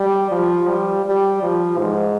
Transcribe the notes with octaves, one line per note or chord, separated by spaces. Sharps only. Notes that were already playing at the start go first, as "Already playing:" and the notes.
Already playing: G3
F3
G3
G3
F3
G#2